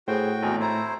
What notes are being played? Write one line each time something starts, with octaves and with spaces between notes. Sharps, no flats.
A2 F#4 G#4 C5 G5
G#1 E2 G#5
A3 E4 C5 A#5